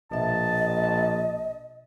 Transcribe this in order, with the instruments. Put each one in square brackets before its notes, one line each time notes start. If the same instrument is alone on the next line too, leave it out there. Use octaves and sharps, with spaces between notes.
[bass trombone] A#1 [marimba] B2 E5 [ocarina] D#5 [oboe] A5